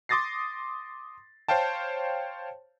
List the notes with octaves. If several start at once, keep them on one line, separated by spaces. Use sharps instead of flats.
C6 D6 D#6 A6 A#6 C7
C5 C#5 F5 G5 A5